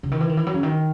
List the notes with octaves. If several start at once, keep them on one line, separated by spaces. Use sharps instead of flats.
C#3
D#3
E3
D#3
E3
F#3
C#3
D#3